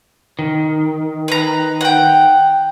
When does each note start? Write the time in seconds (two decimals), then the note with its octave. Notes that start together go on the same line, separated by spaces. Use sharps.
0.39 D#3
1.28 B4 A#5
1.81 F#5 G5